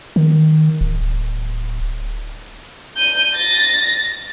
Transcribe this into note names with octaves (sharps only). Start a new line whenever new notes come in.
D#3
D1
G6 D#7
A6 A#6